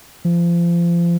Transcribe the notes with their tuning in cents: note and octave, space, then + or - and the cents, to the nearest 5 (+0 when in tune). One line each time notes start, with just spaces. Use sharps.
F3 -30